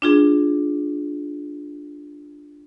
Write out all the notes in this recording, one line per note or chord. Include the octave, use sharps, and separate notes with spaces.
D4 F4 G#4